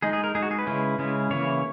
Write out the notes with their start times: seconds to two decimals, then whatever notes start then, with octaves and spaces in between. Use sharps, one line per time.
0.02 G#3 D#4 G#4
0.13 G#4
0.24 A#4
0.35 G#3 D#4 G#4
0.42 F#4
0.51 G#4
0.58 B4
0.67 C#3 G#3 C#4 E4
0.98 C#3 G#3 C#4 E4
1.31 C#3 E3 A#3 E4 C#5